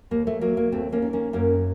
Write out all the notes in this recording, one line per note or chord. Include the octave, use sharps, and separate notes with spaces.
D#2 A#3
A3
F#3 A#3
A#3
D#2 A3 C4
A#3 C#4
D#3
A#3 C#4
F#2 A#3 C#4